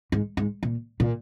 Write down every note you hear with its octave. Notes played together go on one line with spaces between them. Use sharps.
G#2
G#2
A#2
A#2